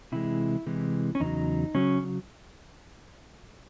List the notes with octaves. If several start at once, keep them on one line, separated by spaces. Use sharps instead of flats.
C3 E3 G#3 E4
C3 E3 G#3
C#4
E2 C#3 F#3 D#4
C#3 F#3 C#4